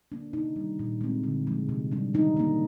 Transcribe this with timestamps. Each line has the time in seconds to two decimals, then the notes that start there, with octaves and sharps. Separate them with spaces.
0.12 A#3 D4
0.33 C3 D#4
0.56 D#3 G3
0.79 A#2
1.01 G#3 C4
1.24 D3
1.46 F3 G#3
1.69 C3
1.92 G3 D4
2.14 D#3 D#4
2.37 A#3 D4